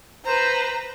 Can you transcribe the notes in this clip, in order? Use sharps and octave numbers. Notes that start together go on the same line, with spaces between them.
B4 C5 A#5